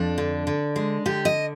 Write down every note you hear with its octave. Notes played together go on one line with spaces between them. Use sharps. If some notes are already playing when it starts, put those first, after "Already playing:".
Already playing: F2 D4
D3
D3
G#3
D3 G4
D#5